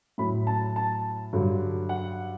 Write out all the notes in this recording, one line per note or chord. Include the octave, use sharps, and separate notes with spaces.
A2 F#3 B5
A5
A5
G2 D3 F#3
F#5